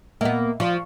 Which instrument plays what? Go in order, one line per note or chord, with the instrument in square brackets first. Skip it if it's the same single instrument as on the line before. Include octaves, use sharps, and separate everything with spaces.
[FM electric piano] A#2 D#5 E5 [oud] A#3 B3
[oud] F3 [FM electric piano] D5 F5 C#6